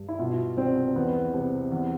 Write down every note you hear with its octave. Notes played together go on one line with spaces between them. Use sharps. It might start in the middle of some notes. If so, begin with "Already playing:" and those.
Already playing: G2
E4
B2 F4
C2 C4
E2 B3
C3
E2